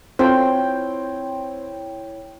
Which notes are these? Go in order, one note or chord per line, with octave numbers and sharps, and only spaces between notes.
C4 E4 F4 A4 C5 C#5 G5